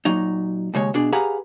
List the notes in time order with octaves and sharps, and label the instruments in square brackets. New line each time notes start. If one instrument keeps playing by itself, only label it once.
[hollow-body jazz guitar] A#2 F#3 D#4
D#2 C#3 G#3 C#5
B2 D4 G#4
G4 G#4 B4 F5 F#5 A#5